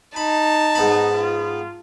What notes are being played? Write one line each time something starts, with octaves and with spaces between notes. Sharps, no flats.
D#4 A5 B5
G#2 B3 B5
F4